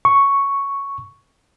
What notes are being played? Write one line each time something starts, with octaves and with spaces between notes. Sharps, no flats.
C#6